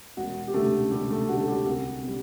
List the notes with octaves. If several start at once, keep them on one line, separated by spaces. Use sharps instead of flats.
E1 F#4
G4
D2 D3 G3 A3 A4
E1 G3 G4
A3 A4
D2 D3 G3 F#4
A4
G3 G4
C2 F#4
B2 G3